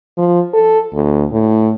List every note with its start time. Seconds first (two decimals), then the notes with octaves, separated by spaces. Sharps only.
0.18 F3
0.54 A4
0.94 D2
1.32 A2